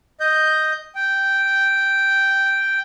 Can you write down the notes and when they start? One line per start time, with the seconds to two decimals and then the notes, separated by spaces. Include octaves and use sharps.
0.20 D#5 G6
0.95 G5